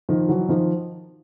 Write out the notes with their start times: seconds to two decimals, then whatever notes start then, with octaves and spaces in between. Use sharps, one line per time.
0.09 D#3 F3
0.29 E3 F#3
0.49 D#3 F3